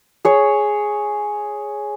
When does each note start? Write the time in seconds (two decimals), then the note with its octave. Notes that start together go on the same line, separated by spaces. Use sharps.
0.25 G#4 C#5